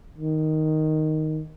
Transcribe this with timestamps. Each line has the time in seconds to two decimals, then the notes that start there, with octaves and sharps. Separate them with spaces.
0.18 D#3